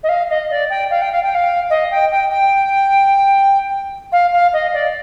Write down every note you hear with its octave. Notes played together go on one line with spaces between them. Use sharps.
D#5
F5
D#5
D5
G5
F5
G5
F5
G5
F5
D#5
G5
G5
G5
F5
F5
D#5
D5